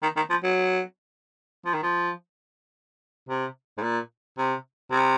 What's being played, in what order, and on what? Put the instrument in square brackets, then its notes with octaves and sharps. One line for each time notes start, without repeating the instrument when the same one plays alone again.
[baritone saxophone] D#3
D#3
F3
F#3
F3
D#3
F3
C3
G#2
A#2
C3
C3